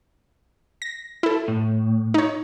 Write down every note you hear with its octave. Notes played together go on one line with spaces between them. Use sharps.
A#6
E4 A4
A2
D#4 C#5